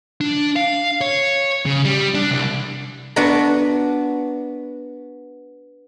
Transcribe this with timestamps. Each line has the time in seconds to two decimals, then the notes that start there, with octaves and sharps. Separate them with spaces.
0.21 D4
0.56 F5
1.01 C#5
1.66 C#3
1.85 G3
2.15 D4
2.31 C2
3.16 B3 D4 F#4 D5 A#5